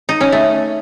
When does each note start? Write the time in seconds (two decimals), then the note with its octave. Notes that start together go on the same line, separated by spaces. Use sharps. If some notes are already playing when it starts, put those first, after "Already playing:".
0.09 D#4
0.21 C#4
0.32 A3